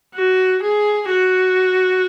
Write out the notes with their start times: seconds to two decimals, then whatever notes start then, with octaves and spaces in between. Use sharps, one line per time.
0.15 F#4
0.62 G#4
1.10 F#4